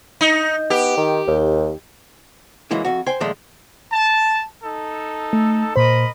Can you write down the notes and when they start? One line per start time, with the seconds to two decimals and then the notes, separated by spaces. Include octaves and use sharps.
0.21 D#4
0.70 B3 G4
0.97 D#3
1.27 D#2
2.71 E3 F#3 G#3 A#3 E4
2.85 F2 F#4
3.06 C5 G5 G#5 C6
3.20 A#2 D#3 F3 G#3 A3
3.91 A5
4.63 D#4 A4
5.33 A3
5.76 A#2 A#4 C5 D#5 B5